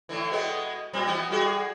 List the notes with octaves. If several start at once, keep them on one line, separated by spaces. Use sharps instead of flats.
A2 D3 E3
B2 G#3 B3
A#2 G3 C4
E3 B3
G3 F#4 G#4